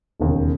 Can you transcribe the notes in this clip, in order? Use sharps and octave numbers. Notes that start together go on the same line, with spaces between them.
E1 D#2 C#3